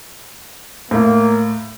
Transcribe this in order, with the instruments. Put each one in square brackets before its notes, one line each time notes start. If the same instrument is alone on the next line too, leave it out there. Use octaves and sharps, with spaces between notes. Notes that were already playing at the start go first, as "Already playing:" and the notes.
[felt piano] A2 [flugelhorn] A#3